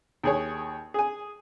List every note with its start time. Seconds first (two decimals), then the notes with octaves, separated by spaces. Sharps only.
0.23 D#2 G#4 C#5
0.94 G#4 G#5